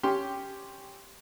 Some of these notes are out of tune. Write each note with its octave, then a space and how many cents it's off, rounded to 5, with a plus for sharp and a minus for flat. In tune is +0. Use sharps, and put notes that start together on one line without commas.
C#4 +10 G4 +0 C6 +0